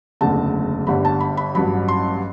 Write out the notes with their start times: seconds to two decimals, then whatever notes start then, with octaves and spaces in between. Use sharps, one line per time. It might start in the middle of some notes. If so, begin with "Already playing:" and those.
0.21 F#1 E2 D3 A3 A5
0.87 G1 G2 D3 G3 B5
1.05 A5
1.20 B5
1.37 B5
1.54 A1 G2 F#3 B5
1.88 C6